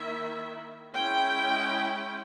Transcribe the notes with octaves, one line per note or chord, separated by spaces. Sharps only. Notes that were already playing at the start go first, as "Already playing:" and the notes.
Already playing: D#3 A#3 E4 E5
G#3 C#4 E4 G5